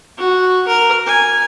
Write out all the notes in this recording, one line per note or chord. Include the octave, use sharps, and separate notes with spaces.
F#4
A#4
G#5